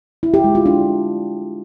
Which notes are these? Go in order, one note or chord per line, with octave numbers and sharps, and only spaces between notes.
E4
G4
G#3
F4
D4